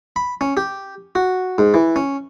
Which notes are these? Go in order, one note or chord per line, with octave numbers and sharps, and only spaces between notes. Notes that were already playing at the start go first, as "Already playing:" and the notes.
B5
C#4
G4
F#4
G#2
E3
C#4